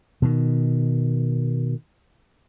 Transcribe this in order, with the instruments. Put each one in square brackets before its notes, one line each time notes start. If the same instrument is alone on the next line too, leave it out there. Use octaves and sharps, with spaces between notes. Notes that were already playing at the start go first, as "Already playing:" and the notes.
[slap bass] B2 D#3